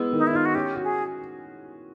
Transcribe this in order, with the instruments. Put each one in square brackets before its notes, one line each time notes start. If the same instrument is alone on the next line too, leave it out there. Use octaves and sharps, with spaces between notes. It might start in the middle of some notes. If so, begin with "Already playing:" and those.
Already playing: [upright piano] G#3 B3 E4
D#3
[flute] D#4
E4
[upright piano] D#4 [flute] F4
[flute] F#4
[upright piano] C#4 [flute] G4
[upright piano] F#4
[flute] G#4